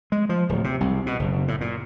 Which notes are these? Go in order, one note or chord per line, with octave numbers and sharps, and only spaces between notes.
G#3
F3
D1
C3
C2
B2
F#1
A2
A#2